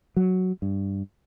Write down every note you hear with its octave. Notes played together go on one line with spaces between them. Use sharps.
F#3
G2